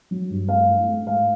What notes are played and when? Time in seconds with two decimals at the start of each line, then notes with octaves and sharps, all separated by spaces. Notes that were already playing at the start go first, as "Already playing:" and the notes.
0.11 F#3
0.30 G2
0.48 A3 F5
0.68 A2
0.87 A3
1.07 G#2 F5